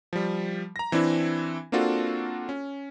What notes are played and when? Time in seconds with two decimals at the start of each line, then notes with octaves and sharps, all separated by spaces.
0.13 F3 G3
0.76 A#5 A#6
0.92 E3 C4 D4 E4
1.72 A#3 C4 D4 F4 F#4 A4
2.49 C#4